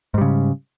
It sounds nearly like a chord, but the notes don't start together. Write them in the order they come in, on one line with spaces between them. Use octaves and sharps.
G#2 G3 C#3